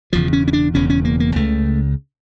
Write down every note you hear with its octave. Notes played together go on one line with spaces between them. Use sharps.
E1 E2 C#3 F3
C#4
C#4
D4
E1 E2 C#3 C#4
C#4
A#3
A#3
C#2 C#3 A3